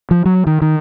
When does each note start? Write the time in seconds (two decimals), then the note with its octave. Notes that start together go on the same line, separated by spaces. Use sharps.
0.11 F3
0.25 F#3
0.47 D#3
0.62 D#3